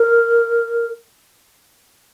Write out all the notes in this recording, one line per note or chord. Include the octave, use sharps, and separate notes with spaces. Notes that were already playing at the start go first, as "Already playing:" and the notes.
Already playing: A#4